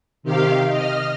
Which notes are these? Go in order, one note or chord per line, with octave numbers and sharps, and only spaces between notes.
C3 D#3 G4 F5
D#5 F6